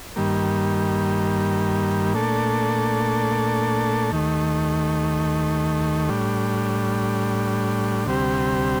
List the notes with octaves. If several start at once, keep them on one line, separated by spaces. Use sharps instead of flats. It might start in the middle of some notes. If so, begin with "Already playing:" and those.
G2 D#3 G3 A#3
A#2 A3 D4 A4
D#2 D#3 A3
A2 G3 D4
D2 C3 G3 C4 G4